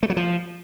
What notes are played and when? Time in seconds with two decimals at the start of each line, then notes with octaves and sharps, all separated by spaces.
0.03 A3
0.10 F#3
0.17 F3